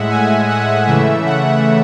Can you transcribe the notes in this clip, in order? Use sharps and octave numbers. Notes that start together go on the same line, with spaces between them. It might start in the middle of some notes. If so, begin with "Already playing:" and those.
Already playing: A2 G#3 E5 F#5
G#5
F#5
C#3 E3 A3 E5
F#5